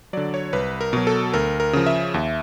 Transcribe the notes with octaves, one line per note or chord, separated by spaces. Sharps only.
D3 F#3 D5
C#5
C2 B4
A#4
B2 F#3
A4
D2 A#4
A#4
C#3 F3
E5
D#2